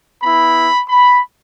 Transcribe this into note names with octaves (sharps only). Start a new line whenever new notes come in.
B3 E4 B5
B5